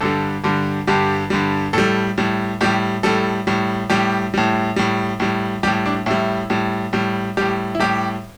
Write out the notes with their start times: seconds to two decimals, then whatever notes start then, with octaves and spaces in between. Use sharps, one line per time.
0.01 G2 D3 G3 A4
0.44 G2 D3 G3
0.87 G2 D3 G3 G4
1.30 G2 D3 G3
1.73 A2 G3 A4
2.18 A2 G3
2.61 A2 G3 G4
3.03 A2 G3 A4
3.47 A2 G3
3.90 A2 G3 G4
4.34 A2 G3
4.76 A2 G3
5.20 A2 G3
5.63 A2 G3 G4
5.86 D4
6.06 A2 G3 E4
6.50 A2 G3
6.93 A2 G3
7.37 A2 G3 G4
7.75 E4
7.80 A2 G3 G4